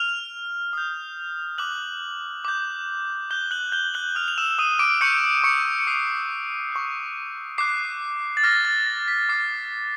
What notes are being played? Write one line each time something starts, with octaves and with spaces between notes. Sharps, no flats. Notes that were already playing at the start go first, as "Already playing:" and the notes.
Already playing: F6 F7
D#6 G6
D6 F#6 F#7
D6 G6
D6 F#6 G6 G7
F#6 F#7
G6 G7
F#6 F#7
D#6 F6 G6 F7
F7
E6 E7
D#6 D#7
D#7
D6 D7
C#6 E6 G6 C#7
C#6 C#7
C#7
D#6 F#6 C7
C#6 F#6
D6 F#6 C7
A6
D6 F6 A#6
A6
A#6
B6
D6 F6 C7